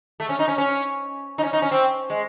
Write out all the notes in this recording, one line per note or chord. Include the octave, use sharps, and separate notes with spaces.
A3
C#4
D#4
C#4
C#4
D#4
C#4
D#4
C#4
C4
G#3